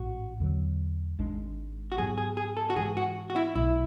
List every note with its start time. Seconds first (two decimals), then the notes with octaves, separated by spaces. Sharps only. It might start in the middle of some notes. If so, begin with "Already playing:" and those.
Already playing: A1 G#2 G#3 F#4
0.40 E2 D3 F#3
1.19 G#1 G#2 G#3 D4
1.92 F#4
1.98 G#2 F#3 B3 G#4
2.18 G#4
2.37 G#4
2.57 A4
2.70 F#4
2.76 G#2 E3 G#3 G#4
2.97 F#4
3.30 F#4
3.36 E4
3.55 B1 B2 A3 E4